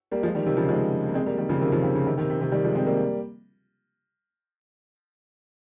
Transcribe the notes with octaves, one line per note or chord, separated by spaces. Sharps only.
G3 A#3
F3 G#3
D#3 G3
C3 D#3
C#3 F3
F3 G#3
A#3
G#3 C4
G3 A#3
D#3 G3
C#3 F3
C3 D#3
C#3 F3
C3 D#3
C#3
C3 D#3
C3 D#3
C3
C3 D#3
D#3 G3
F3 G#3
G#3 C4
G3 A#3